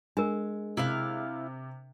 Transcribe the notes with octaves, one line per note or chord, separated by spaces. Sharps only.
G#3 D4 A#4
C3 E4 F5 F#6